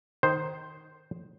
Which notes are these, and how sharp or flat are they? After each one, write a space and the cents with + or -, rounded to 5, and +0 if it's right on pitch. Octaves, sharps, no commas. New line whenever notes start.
D#3 +0 C5 +0